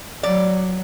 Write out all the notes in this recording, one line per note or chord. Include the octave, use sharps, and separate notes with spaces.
F#3 D5